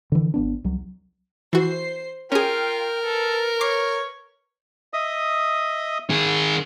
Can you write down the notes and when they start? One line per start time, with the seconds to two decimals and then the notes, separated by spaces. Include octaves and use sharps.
0.12 D3 E3
0.34 G#1 B3 D4
0.64 C2 F#3
1.53 E3 F#4 C5 C7
2.32 C#4 F4 G#4 A#4 G5
3.04 A4 B4
3.61 C#5 D6 C7
4.93 D#5 E5 D#6
6.10 D#3 G#4